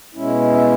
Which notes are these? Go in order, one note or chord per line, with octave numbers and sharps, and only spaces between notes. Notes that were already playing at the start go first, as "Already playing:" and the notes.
B2 G#3 C#4 E4
E5